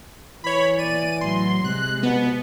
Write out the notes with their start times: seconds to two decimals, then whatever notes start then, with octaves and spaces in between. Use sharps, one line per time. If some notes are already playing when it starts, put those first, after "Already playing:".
0.44 E3 C#5 B5
0.79 D5 D#7
1.21 A2 F#3 C6
1.64 C3 G#3 F#6
2.03 B2 B3